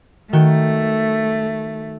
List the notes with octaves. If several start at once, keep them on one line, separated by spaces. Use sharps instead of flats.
D#3 A3 F#4 G5